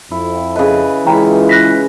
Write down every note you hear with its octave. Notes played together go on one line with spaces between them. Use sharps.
F2 E4
C#3 B4 D#5
E3 G#3 C#4 F4 G5 A#5 B5
F#6 A#6 B6